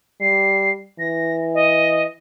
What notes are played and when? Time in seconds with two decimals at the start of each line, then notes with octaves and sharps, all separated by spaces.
0.21 G3 C7
0.99 E3 A#6
1.54 D#5